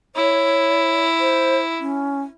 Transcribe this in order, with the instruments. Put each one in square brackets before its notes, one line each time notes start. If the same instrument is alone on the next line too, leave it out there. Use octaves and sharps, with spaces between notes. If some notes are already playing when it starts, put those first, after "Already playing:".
[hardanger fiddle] E4 [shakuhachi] C#5
[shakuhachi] C5
C#4